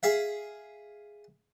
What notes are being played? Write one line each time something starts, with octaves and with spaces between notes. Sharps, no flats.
G#4 E5 F5